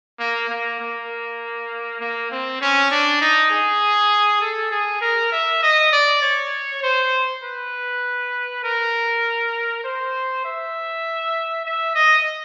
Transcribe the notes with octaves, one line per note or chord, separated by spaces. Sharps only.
A#3
A#3
A#3
A#3
C4
C#4
D4
D#4
G#4
A4
G#4
A#4
E5
D#5
D5
C#5
C5
B4
A#4
C5
E5
E5
D#5